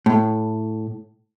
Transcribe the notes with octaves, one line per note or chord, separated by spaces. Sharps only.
A2